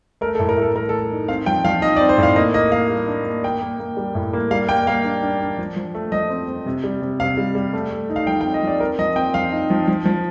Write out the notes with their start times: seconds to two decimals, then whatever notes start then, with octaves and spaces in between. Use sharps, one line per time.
0.21 A3 A#4
0.35 A4
0.39 A2
0.49 A#4
0.57 A2 A4
0.75 A3 A#4
0.89 A4
0.93 A3
1.11 D#4
1.28 C4 F5
1.46 F3 G5
1.64 F3 F5
1.82 D#4 D#5
1.96 D5
2.00 C4
2.09 C5
2.18 A2
2.23 F5
2.36 A#3 D#5
2.54 A#3 D#5
2.71 A#3 F5
2.89 G3
3.08 D4
3.25 A#3
3.44 A#3 G5
3.62 A#3
3.80 A#3
3.97 G3
4.15 A2
4.33 A#3
4.51 G3 F5
4.69 A#3 G5
4.87 A#3 F5
5.05 D4
5.22 D4
5.41 D4
5.58 F3
5.76 F3
5.95 A3
6.12 F3 D#5
6.30 C4
6.48 C4
6.66 C3
6.84 G3
7.02 C3
7.20 C3 F5
7.37 G3
7.55 G3
7.73 A3
7.91 A3
8.09 D#4
8.16 F5
8.27 F3 G5
8.41 G5
8.45 C4
8.54 D#5
8.63 F3 D5
8.80 C4 A#4
8.99 F3 D#5
9.16 C4 G5
9.34 F3 F5
9.52 D#4
9.70 F3
9.87 F3
10.05 F3